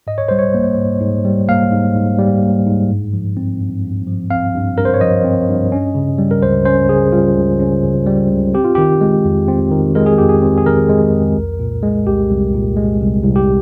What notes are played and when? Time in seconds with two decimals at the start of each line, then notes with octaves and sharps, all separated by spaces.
0.07 G#2 D#5
0.18 C#5
0.28 G3 C5
0.39 C#5
0.54 A#3
0.78 G#2
1.01 G#2
1.25 G3
1.49 A#3 F5
1.72 G#2
1.95 G#2
2.19 G3
2.43 A#3
2.66 G#2
2.90 G2
3.13 F3
3.37 C4
3.60 G2
3.84 G2
4.07 F3
4.30 C4 F5
4.54 G2
4.78 G2 A#4
4.85 C5
4.94 C#5
5.01 F3 D#5
5.24 C4
5.49 G2
5.72 C#4
5.95 C#3
6.18 G3
6.31 A#4
6.43 C#2 C5
6.65 C#4 C5
6.89 C#3 G#4
7.12 G3 F4
7.37 C#2
7.60 C#4
7.83 C#3
8.06 G3
8.31 C#2
8.54 C4 G4
8.65 F4
8.75 D#3 G4
9.01 G#3
9.25 F2
9.48 C4
9.71 D#3
9.95 G#3 A#4
10.06 G#4
10.18 F2 G4
10.29 G#4
10.42 C4
10.58 G#4
10.66 D#3 A#4
10.89 G#3
11.13 F2
11.36 C2
11.59 A#2
11.83 G#3
12.07 C2 G4
12.31 C2
12.54 A#2
12.77 G#3
13.01 C2
13.24 C2
13.36 G4